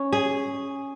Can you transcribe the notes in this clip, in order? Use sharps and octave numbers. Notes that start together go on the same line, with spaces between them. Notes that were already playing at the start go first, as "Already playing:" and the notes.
Already playing: C#4
G#4